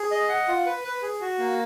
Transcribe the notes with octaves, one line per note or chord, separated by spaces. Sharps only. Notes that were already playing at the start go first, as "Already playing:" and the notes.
Already playing: G#4
D#5
F#5
F4
B4
B4
G#4
F#4
A#3